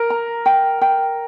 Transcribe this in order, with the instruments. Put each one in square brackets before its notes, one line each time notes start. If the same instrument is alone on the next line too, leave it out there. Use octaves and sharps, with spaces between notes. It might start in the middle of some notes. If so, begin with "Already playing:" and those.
Already playing: [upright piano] A#4
[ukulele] A#5
G5
G5